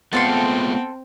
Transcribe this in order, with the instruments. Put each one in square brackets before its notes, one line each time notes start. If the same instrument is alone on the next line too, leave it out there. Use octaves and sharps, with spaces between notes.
[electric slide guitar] G#3 A3 F4 [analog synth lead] B3 [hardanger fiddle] C4 [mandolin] A4 F5 C6